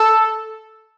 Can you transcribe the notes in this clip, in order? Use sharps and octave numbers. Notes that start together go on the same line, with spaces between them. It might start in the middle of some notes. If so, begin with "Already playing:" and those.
Already playing: A4